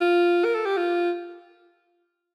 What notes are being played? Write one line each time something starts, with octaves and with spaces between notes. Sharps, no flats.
F4
A#4
A4
G4
F4